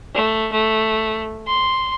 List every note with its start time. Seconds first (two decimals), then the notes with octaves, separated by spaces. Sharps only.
0.14 A3
0.52 A3
1.47 C6